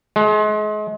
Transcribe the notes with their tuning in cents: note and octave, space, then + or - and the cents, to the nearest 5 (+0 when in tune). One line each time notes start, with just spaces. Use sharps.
G#3 +35